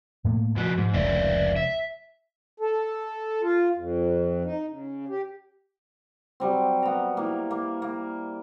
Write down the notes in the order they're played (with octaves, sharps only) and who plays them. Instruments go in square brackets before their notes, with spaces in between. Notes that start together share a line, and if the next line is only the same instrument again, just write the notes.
[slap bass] A2 A3 A#3
[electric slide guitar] A#2 F#4 [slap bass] F3
[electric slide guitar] G#2
[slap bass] F1 C#2 D#3 [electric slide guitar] C#5 D5 E5
[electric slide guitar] E5
[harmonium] A4
F4
F2
D#4
C#3
G4
[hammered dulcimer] F#3 G3 C4
B3 A#5
A#3 E4
A#3
A#3